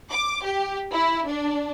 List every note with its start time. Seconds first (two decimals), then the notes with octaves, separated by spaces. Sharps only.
0.12 D6
0.44 G4
0.92 E4
1.27 D4